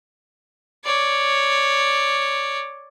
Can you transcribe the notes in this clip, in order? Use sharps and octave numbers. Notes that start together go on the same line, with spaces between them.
C#5 D5